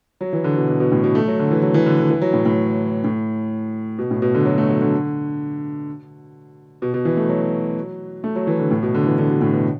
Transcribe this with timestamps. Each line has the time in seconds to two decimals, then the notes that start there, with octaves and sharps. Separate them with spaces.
0.21 F#3
0.33 E3
0.44 D3
0.56 B2
0.68 B2
0.80 B2
0.92 A2
1.04 B2
1.15 A3
1.28 F#3
1.39 D3
1.51 E3
1.62 F#3
1.74 E3
1.86 D3
1.98 D3
2.10 E3
2.22 F#3
2.33 A2
2.45 A2
3.04 A2
3.99 B2
4.11 A2
4.22 B2
4.35 D3
4.46 F#3
4.58 A3
4.69 F#3
4.81 D3
6.82 B2
6.94 B2
7.05 E3
7.17 A3
7.29 F#3
8.24 A3
8.36 F#3
8.47 E3
8.59 D3
8.71 A2
8.83 B2
8.94 D3
9.06 E3
9.18 D3
9.30 B2
9.41 A2
9.53 B2